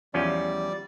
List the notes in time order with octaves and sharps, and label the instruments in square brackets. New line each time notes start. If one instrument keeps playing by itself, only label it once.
[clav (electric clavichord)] E2 F3 C#4 [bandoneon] G3 D5